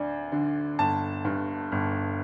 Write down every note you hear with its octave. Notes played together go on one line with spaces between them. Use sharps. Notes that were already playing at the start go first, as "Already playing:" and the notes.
Already playing: D2 D4
D3
G1 A5
G2
G1